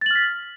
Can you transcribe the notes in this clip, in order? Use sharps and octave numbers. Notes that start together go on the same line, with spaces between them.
F6 A6 B6 F#7